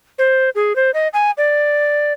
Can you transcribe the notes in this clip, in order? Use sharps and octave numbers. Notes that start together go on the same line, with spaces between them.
C5
G#4
C5
D#5
G#5
D5